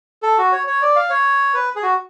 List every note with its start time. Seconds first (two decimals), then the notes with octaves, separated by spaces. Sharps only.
0.23 A4
0.38 F#4
0.52 C#5
0.67 C#5
0.82 D5
0.96 F5
1.10 C#5
1.54 B4
1.76 G#4
1.83 F#4